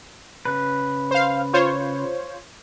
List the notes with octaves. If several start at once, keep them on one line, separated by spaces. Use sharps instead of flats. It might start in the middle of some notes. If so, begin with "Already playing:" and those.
C#3 B4
C5 F5
F4 C5 C#5